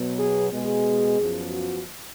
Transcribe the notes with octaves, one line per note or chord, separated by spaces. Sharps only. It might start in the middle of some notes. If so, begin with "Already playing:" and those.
Already playing: B2 F#3 B3
G#4
B2 G#3 B3 G#4
F#2 F3 B3
F#4